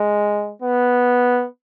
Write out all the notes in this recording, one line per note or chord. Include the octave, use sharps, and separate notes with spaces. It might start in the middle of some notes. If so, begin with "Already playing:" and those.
Already playing: G#3
B3